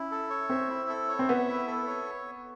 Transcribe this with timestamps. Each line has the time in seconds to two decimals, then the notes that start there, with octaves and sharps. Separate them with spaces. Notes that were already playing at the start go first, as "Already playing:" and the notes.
Already playing: C#4 E4
0.11 A4
0.30 C#5
0.50 C4 E5
0.70 E4
0.89 A4
1.08 C#5
1.19 C4
1.28 B3 E5
1.48 E4
1.67 A4
1.87 C#5